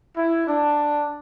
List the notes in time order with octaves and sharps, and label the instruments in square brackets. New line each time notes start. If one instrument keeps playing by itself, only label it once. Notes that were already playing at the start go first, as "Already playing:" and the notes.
[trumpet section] E4
D4